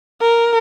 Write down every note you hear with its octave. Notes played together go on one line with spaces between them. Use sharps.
A#4